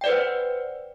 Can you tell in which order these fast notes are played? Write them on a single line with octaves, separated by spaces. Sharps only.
G5 D5 B4 C5 F#5